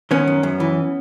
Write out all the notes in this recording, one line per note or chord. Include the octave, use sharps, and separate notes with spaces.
D#3 B3 C#4
F#2
F#2
E3